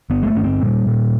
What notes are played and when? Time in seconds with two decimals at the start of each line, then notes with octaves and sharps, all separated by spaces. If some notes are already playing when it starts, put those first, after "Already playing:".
0.10 G1 B3
0.23 G#3
0.27 A3
0.35 G1 C#4
0.44 C4
0.61 A#2 G3
0.87 A#2